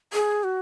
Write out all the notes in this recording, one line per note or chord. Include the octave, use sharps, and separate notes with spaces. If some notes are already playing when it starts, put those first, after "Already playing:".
G#4
F#4